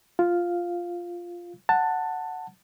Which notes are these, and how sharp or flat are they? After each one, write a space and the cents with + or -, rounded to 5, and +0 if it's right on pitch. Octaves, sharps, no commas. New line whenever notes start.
F4 +0 F5 +0
F#5 +0 A5 +15